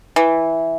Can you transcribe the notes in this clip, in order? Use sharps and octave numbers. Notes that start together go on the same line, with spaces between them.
E3